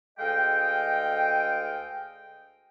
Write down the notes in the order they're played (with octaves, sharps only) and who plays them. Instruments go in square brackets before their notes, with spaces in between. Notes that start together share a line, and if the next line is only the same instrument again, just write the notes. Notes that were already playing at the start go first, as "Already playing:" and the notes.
[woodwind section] D2 G#3 A4 D#5 F5 G5